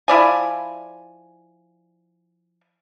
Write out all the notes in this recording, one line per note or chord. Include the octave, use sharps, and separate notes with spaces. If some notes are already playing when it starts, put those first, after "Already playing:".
F3 E4 D5 G#5